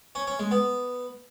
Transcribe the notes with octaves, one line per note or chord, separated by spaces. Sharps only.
C#4
C#4
G#3
B3